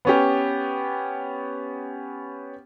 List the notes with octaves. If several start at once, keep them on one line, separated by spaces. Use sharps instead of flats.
B3 C#4 G4